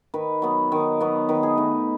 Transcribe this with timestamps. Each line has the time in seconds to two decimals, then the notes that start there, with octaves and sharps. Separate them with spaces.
0.14 D#3 B4
0.42 F#3 B3
0.72 D#3
1.00 F#3 B3
1.29 D#3 B4
1.43 G#4
1.57 A3 D#4